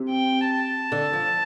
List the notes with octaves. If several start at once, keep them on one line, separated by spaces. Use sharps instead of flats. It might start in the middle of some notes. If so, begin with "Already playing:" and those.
Already playing: C3
G5
A5
D3
F3